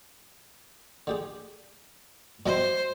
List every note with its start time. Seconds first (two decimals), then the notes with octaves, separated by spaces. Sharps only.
1.07 D3 G4 G#4
2.46 B2 G3 E4 C5